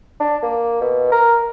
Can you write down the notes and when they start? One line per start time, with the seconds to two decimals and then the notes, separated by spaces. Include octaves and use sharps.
0.20 D4
0.43 A#3
0.81 B2
1.12 A#4